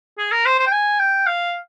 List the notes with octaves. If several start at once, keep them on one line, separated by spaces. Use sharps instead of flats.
G#4
A#4
C5
C5
G5
G#5
G5
F5